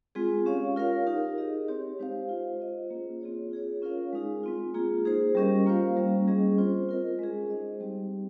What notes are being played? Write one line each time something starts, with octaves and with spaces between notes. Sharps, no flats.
G#3 C4 F4 G#4
C#4 G4 C#5 F5
F4 A#4 C#5 F5
D#4 G4 A#4
D#4 G#4 D#5
C4 G4 C#5
G#3 D#4 G4 C5 F5
F4 C5 D#5
F4 C5 D#5
A#3 C#4 F4 G#4
C4 F4 G#4 C#5
F4 G#4 C#5
C#4 F4 A#4 C#5 F5
G#3 D#4 G#4
G#3 C4 F4
A#3 F4 G#4
D#4 G#4 C5
G3 C#4 G4 A#4 D#5
A#3 F4 C5 F5
G3 A#3 C#4
G3 C#4 G#4 D#5
C4 F4 C5
F4 A#4 D#5
G#3 C#4 G#4
D#4 G#4 C5 D#5
G3 C4 D#4 G4